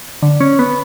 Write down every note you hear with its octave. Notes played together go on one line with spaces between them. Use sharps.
D3
C#4
B3